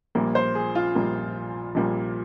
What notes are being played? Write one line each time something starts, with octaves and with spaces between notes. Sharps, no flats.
A#1 A#2 G3 A#3
C5
G#4
F4
A#1 A#2 G3 A#3
A#1 A#2 G3 A#3